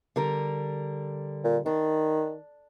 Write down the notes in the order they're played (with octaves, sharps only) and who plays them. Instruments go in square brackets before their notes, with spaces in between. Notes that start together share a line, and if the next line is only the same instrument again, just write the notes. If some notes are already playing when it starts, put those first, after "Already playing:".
[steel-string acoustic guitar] D3 G3 A#4
[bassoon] A#2
[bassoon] D#3 [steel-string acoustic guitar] D4